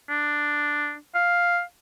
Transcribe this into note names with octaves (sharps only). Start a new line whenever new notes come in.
D4
F5